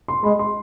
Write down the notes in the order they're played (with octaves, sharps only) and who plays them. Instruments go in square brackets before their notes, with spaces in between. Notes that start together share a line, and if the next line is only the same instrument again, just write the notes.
[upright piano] C6
[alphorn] G#3 [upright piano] B5
[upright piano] C6